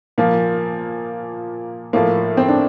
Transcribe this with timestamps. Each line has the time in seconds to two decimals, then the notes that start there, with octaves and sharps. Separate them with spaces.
0.18 A#2 F3 A#3
1.93 A2 F3 A#3
2.37 C4
2.48 D4